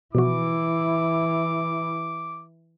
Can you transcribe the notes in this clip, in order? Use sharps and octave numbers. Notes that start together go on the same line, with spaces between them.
B2 E3 F3 E4 F#4 D6